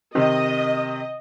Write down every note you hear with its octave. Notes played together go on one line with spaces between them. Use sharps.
C3 D#3 C4 D#5